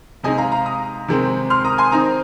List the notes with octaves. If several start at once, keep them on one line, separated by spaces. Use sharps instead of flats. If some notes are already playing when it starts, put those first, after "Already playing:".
C3 G#3 D#4 D#5 G#5
F5 A#5
F5 A#5
A#5 D#6
C3 D#3 G#3 C4
C6 F6
A#5 D#6
G#5 C6
D#3 C4 D#4 A#5 D#6